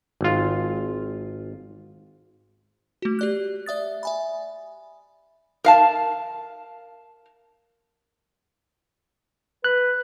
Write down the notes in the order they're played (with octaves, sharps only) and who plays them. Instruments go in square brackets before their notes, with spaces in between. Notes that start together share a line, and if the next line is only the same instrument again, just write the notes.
[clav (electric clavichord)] G#1 F4
[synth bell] A3 F#4
G4 D5 F#6
D5 E5 D#6 A6
E5 G#5 B5
[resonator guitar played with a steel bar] A#4 F5 A5
[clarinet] B4 [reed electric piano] F#6